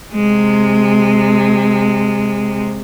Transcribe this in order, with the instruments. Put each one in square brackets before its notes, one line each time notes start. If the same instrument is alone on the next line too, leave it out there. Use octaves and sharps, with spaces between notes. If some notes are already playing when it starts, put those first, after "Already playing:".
[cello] C3 G#3